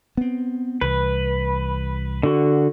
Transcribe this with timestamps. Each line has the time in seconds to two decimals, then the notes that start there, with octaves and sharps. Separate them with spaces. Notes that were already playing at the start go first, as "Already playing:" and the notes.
0.17 B3 C4
0.81 C2 E3 B4
2.23 D3 F#4